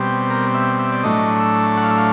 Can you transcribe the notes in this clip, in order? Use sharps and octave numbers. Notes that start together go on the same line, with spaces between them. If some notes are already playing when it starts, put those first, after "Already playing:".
Already playing: B2 G3 C4
A#4
E5
E5
D5
A2 F#3 A3 D4 D#5
E5
F#5
F5
E5
F5